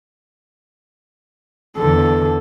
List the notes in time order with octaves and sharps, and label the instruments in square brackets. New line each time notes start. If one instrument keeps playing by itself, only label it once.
[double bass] E2 D3 [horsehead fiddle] A4